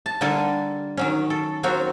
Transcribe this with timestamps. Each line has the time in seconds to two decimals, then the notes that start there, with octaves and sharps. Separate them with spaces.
0.06 A5
0.21 D3 G3 A#3 D4 A4 G#5
0.97 D#3 F#3 C#4
1.30 A4
1.63 F#3 A#3 C4 F#4 C#5